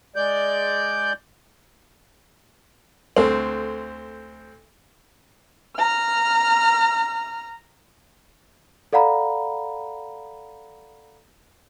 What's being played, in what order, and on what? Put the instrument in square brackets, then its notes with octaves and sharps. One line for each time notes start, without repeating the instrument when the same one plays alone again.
[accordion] G#3 D5 G6
[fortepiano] D2 A3 C4
[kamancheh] A#5 F6
[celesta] A4 D5 F5 F#5 A#5 B5